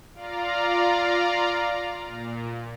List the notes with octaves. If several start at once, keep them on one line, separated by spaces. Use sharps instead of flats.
F4 D5 F5 A#5
A#2